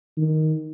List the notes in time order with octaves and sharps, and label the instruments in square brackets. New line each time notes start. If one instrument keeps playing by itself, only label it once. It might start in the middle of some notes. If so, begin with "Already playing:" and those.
[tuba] D#3